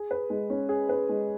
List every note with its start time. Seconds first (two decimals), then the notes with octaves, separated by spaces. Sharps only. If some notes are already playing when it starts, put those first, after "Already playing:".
Already playing: G#4
0.11 B4
0.30 G#3
0.50 C#4
0.69 G#4
0.89 B4
1.09 G#3